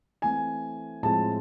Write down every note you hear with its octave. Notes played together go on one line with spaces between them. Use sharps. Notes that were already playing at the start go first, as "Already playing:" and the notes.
E3 A3 C4 G#5
A2 F3 G#3 C4 A5